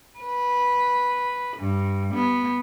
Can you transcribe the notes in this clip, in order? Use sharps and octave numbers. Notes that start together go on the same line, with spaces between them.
B4
G2
B3